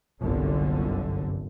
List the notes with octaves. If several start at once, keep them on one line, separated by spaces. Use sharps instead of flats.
G1 C2 F#2 D3